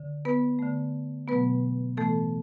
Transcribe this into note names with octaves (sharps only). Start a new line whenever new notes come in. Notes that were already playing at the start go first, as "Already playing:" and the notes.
Already playing: D3
B3 B4
D3 A3
B2 F#3 A3 B3 B4
A2 E3 A3 B3 A4